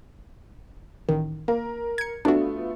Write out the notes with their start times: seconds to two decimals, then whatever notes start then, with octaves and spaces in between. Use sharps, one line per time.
1.09 A1 D#3
1.48 A#3 A#4
1.98 G#6 C#7
2.25 A3 B3 D4 F4 F#4